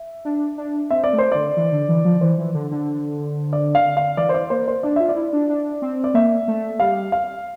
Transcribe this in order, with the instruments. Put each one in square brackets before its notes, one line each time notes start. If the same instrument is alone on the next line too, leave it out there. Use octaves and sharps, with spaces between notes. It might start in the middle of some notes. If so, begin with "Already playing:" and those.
Already playing: [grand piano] E5
[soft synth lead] D4
D4
[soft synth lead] C4 [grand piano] E5
[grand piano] D5
[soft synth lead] A3
[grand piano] C5
[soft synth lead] D3 [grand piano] D5
[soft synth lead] E3
D3
E3
F3
[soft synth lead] E3 [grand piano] C5
[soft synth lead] E3
D3
D3
[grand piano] D5
F5
F5
[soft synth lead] E3 [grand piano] D5
[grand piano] C5
D5
[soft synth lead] A#3 [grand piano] C5
[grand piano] C5
[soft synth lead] D4 [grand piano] D5
[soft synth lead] F4 [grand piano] E5
[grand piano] D5
[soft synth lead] E4
D4
D4
C4
[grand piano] D5
[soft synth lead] A#3 [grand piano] E5
[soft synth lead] A3
[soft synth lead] G3 [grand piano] F5
[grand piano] F5